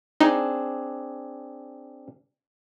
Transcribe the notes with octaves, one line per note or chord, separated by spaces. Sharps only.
C4 D4 D#4 G#4